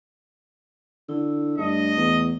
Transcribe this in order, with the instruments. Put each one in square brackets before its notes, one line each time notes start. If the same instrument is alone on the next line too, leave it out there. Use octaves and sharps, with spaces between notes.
[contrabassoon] D3 [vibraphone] E4 E6
[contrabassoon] G2 [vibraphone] A3 [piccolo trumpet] D#5
[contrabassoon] E2